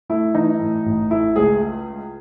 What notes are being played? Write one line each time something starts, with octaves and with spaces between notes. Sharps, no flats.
A3 E4
E3 D#4
A2
A1
A3 E4
C#2 G#4